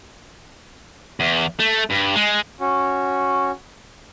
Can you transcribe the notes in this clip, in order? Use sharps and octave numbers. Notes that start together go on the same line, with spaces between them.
E2
A3
G2
G#3
C#4 F#4